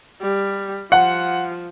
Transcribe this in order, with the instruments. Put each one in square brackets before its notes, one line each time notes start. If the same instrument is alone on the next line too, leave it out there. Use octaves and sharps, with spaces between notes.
[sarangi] G3
[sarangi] F3 [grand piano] F#5